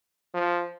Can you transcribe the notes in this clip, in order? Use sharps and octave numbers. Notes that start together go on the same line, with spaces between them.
F3